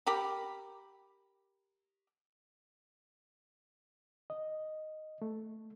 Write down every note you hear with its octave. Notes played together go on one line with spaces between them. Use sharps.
G4 A#4 B5
D#5
A3